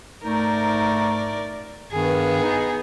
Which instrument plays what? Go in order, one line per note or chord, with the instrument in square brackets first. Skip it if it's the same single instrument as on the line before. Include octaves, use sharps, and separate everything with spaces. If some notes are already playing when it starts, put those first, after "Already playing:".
[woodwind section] G#2 A3 D#4 [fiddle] A#4 D5
[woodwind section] G2 D#3 [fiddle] B3 G#4
[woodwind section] D#4